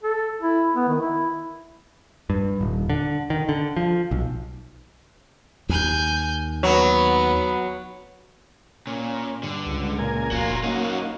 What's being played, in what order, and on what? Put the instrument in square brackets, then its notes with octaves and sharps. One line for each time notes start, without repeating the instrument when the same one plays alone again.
[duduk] A4
E4
B3
D#3
E4
[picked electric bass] G2
D#1
D3
D#3
D3
F3
B1
[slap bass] D#2 [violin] G#5 G6
[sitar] F#3 [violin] B3
[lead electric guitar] A#2 [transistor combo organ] C#4
[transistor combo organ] G2 [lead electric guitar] D3
[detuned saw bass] C#2
[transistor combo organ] A#2 A#4 G#5
[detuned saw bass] F1 [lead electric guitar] F#4 F5
[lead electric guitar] F#2 D#4 [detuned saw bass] A#3 [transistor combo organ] C#4 F#4